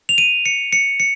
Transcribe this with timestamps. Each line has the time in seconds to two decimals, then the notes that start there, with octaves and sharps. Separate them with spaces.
0.09 F7
0.18 D#7
0.46 C#7
0.73 C#7
1.00 C#7